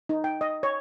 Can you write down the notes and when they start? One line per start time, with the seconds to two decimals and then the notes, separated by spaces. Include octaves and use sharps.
0.09 D#4
0.24 G5
0.41 D#5
0.63 C#5